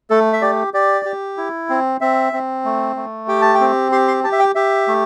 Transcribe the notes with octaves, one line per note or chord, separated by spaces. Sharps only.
A3 A4
E5
G4 D5
G4 D5
G4
E4
C4
C4 E5
C4
A3
A3
G4 G5
A5
G5
C4
G4 C6
C6
G4 A5
E5
G5
G4 E5
A3